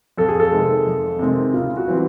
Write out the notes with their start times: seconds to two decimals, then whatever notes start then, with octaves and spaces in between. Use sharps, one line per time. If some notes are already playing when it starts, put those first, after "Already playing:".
0.18 F2 A4
0.29 G#4
0.40 A4
0.52 C3 D#3 G#3 C4
0.86 F2
1.19 C3 D#3 G#3 C4
1.54 C#3 F4
1.77 F#4
1.88 E3 G3 C4